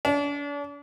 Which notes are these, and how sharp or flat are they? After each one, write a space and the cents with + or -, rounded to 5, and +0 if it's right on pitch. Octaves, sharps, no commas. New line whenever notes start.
D4 -40